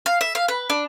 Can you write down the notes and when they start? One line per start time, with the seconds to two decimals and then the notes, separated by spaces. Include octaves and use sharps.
0.06 F5
0.21 E5
0.35 F5
0.48 B4
0.70 D4